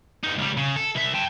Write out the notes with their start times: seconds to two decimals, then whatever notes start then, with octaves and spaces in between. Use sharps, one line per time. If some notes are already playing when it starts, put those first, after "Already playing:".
0.24 G2 D#4
0.38 C#2 G3
0.57 C#3
0.77 A4
0.96 C2 E5
1.15 G5 A5